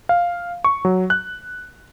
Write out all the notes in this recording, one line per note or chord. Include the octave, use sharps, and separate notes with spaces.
F5
C#6
F#3
F#6